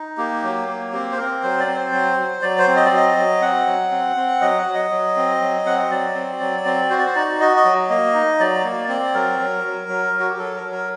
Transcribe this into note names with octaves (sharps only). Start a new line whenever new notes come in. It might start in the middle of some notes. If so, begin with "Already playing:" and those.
Already playing: D#4
A#3 G4
F#3
A#3
C4 G4
C5
C4 A#4
F#3 C5
D5
C4
C5
F#3
F#3
F#3 D5
C5
C4
D#5
D5
F#3 D#5
F#3
C4 F#5
F#3
C4
C4
F#3 D#5
F#5
F#3
D#5
F#3
C4
F#3
C4 F#5
D#5
F#3 D5
C4
F#3
C4
F#4 C5
D5
C5
D#4 D5
F#4 D#5
D#5
F#3
A#3 D#5
D#4
F#3 D5
A#3
C4 D5
F#3 A#4
F#3
F#3
F#3
F#3
F#4
G4
F#3 A4
A#4
F#3
A#4